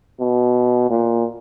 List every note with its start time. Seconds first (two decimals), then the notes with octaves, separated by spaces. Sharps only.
0.20 B2
0.90 A#2